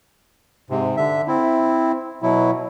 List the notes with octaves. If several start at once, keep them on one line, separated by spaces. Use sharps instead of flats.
G#2 C3
D3 E5
C4 E4
B2 F#3 E4